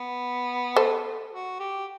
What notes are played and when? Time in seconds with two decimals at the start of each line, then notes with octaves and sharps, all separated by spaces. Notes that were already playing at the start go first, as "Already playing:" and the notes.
Already playing: B3
0.76 A4 C5
1.32 F#4
1.60 G4